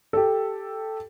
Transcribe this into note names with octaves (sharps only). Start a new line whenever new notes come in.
G4 A4